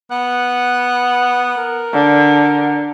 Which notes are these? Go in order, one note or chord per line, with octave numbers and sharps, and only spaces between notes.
B3 F#5
A#4
D3